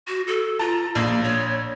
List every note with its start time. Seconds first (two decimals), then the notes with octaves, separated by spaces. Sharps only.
0.08 F#4
0.28 A4
0.59 F4 A5 A#5
0.95 A#1 A#3
1.23 C#5